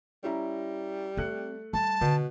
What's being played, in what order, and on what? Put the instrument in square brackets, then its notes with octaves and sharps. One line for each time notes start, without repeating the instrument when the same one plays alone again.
[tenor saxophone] G3 [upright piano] C#4 E4 A#5
[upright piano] A3 F#6 C#7 [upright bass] C4
[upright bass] G3 [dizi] A5
[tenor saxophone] B2 [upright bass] D3